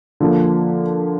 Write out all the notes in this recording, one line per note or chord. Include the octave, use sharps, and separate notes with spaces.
D3 F3 A#3